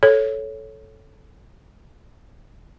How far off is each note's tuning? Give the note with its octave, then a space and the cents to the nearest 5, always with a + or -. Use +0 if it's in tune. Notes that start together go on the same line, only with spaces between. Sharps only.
A4 -10 C#5 +0